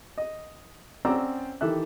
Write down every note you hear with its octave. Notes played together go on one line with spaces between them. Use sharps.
D#5
C4 C#4 D5 F#5 A#5 E6
D#3 E3 G4 A4 E5 F#6